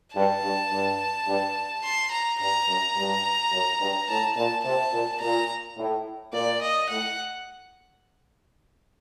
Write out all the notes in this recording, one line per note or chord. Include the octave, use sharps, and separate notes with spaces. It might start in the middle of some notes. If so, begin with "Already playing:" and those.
G2 A5
G2
G2
G2
C6
A#5
G2 A#5
F#2
G2
F#2
G2
A2 A5
A#2 A5
C3 A5
A#2
A#2 A#5
A2
A#2 D5
D#5
A2 F#5